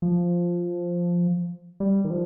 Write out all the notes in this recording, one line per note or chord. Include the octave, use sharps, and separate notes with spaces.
F3
G3
D#3
F3